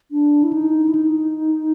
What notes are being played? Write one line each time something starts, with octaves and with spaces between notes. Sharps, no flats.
D4
E4
D#4
E4
D#4